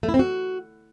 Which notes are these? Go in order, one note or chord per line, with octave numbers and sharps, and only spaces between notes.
A3
E4
C4
F#4